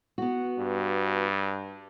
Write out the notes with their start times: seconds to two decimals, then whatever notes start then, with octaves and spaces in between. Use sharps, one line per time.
0.18 B3 F#4
0.59 G2